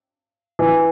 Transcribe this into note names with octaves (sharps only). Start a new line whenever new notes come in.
E3